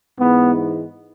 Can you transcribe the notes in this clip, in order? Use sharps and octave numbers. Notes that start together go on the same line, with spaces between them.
G#2 E3 G#3 B3